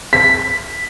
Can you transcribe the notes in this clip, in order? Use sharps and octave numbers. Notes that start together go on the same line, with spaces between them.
B6